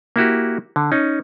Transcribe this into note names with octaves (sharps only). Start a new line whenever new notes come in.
A#3 E4 F#4 G4
D3
C#4 D#4